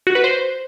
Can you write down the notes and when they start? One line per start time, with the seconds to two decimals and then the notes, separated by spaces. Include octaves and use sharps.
0.07 F#4
0.15 B4
0.24 C5